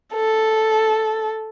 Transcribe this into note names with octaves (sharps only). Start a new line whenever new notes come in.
A4